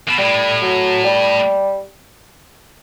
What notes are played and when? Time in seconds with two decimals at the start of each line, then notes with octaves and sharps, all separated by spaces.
0.08 B2
0.18 A2 G3
0.61 F#3
1.04 G3